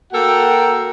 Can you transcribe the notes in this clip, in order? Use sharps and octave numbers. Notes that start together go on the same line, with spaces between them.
A#3 F#4 A4 A#4 F#5 G5